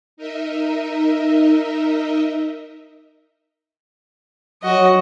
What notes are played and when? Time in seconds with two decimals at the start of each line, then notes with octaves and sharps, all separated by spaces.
0.17 D#4 A#4 D#5 E5
4.63 F#3 F#4 D#5